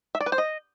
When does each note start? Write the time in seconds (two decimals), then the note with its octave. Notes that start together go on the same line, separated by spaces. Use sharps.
0.15 E5
0.21 D5
0.26 B4
0.32 C5
0.38 D#5